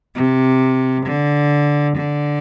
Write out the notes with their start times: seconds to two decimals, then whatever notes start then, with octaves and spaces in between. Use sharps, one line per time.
0.15 C3
1.05 D3
1.97 D3